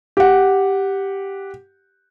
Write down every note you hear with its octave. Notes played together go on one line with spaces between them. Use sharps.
G4 F#5